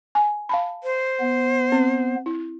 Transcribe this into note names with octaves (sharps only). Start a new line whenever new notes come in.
G#5
F5 A5 B5
C5
B3
C4
E4